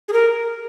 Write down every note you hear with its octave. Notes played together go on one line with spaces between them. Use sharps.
G#4
A#4